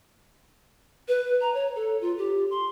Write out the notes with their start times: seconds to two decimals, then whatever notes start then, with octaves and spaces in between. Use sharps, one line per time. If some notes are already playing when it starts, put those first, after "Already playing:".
1.08 B4
1.41 A#5
1.54 C#5
1.76 A4
2.01 F4
2.18 G4
2.50 C6